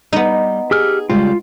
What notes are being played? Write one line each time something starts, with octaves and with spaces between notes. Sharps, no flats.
G3 B3 D#4
G4 G#4 E6 F6
C#3 G3 G#3 F4